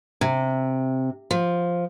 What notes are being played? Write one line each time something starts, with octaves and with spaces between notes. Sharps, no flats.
C3
F3